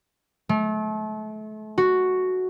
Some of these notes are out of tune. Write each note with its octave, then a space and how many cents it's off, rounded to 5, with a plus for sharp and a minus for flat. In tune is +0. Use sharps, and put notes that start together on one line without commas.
A3 -35
F#4 +0